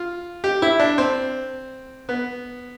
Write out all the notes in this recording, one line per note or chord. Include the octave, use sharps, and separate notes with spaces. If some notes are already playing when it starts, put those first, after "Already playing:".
Already playing: F4
G4
E4
D4
C4
B3